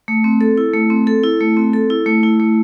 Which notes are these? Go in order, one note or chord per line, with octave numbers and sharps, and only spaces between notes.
A3
C4
A4
E4
A3
C4
A4
E4
A3
C4
A4
E4
A3
E4
A3